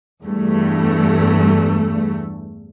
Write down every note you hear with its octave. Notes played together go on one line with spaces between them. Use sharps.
E2 G2 A3